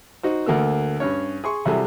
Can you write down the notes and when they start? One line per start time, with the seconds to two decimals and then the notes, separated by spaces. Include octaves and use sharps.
0.23 D#4 F#4 C5
0.46 D2 A3 A#3 E6
1.00 G2 C#4 C#5
1.44 G#4 C6 C#6
1.66 C3 F#3 G3 E4 G#4 A4